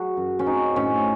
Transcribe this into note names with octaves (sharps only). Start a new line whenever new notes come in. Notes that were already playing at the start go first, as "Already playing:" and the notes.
Already playing: F#3 F#4 G#4
F#2
C#4
C4 D#4
A2 C#4